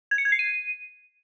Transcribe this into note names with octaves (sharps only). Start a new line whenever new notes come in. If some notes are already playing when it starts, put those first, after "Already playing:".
G#6
C#7
G#6
C7
D#7